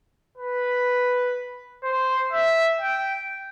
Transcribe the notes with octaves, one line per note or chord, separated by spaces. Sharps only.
B4
C5
E5
G5